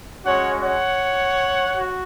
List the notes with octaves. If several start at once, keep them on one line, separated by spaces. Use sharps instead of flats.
G#3 C#4 F#4 C#5 F#5
C#5 F#5
F#4